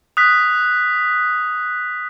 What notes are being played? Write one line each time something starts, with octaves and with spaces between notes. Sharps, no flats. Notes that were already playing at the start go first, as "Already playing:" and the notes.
D#6 F#6 B6